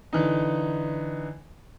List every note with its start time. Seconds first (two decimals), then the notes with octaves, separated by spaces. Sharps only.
0.13 D3 E3 D#4